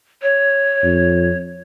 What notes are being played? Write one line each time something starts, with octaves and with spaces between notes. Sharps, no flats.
C#5
F2